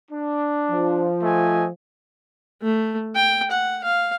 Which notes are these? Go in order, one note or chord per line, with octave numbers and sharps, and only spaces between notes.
D4
F3
A3 D#5 G#5
A3
G5
F#5
F5